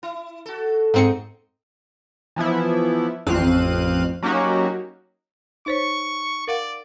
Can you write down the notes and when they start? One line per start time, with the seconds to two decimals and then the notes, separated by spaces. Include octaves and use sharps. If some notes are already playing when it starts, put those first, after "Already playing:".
0.03 E4
0.46 F#4 A4
0.94 G#2 C4 D#5 C#7
2.36 E3 F3 B3 E4
3.27 A1 F2 C4 F5 F#6 D#7
4.23 F#3 A#3 C#4 D#4 F#4 G4
5.66 D#4 C5 C#5 C#6
6.48 A#4 D5 F5 F#5